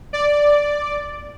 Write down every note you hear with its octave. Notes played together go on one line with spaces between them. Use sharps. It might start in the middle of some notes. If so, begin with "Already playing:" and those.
D5